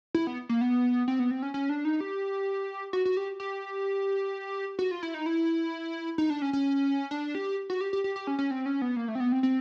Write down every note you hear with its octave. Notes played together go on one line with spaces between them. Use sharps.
E4
B3
A#3
B3
C4
B3
C4
C#4
C#4
D4
D#4
G4
F#4
F#4
G4
G4
F#4
F4
E4
D#4
E4
D#4
D4
C#4
C#4
D4
G4
F#4
G4
G4
G4
G4
C#4
C#4
C4
C#4
B3
A#3
A3
C4
B3
C4
C4